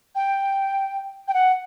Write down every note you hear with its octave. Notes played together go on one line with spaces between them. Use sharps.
G5
G5
F#5